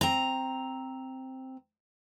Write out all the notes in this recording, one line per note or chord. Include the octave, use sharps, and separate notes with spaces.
C4 A#5